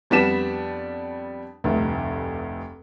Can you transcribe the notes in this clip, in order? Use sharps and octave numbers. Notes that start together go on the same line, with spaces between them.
F2 G3 B3 D4 B6 E7
F1 D2 G2